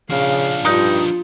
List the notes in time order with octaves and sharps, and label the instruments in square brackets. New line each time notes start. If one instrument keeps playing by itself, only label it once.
[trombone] C#3 [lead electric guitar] F3 D4 [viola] F5
[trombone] G2 [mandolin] D#4 G6 [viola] F4